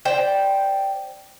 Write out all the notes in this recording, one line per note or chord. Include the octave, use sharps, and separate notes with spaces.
C5 D5 G5